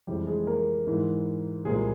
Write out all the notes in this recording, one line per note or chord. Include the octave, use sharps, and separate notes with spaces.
F2 C3 E3 G3 G#3 G4
G#3 G#4
A#3 A#4
G#2 E3 G#3
C2 A#2 F3 G#3 A#3 G#4